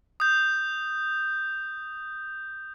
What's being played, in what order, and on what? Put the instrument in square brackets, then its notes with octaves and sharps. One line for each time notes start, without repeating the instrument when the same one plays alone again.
[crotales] D#6 G6